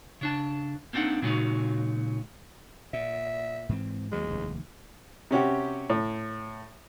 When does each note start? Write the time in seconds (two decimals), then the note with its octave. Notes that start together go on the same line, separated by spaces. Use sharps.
0.21 C#3 D4 A5
0.93 A#3 C4 D4 D#4 F#5
1.22 A#2 C#3 F#3 G#3 D#4 F#4
2.93 A#2 E5
3.69 G#2 E3 C4
4.12 D#2 D#3 F#3 G#3
4.27 F1 D#2
5.31 C3 C#4 F#4 G4
5.90 A2